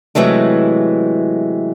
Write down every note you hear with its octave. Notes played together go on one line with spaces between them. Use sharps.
C3 E3 F#3 G#3 A3